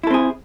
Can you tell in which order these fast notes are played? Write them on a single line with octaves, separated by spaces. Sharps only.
E4 A4 C4 G#4